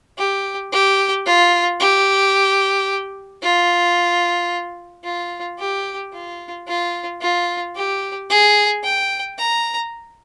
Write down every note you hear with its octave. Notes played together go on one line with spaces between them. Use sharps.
G4
G4
F4
G4
F4
F4
G4
F4
F4
F4
G4
G#4
G5
A#5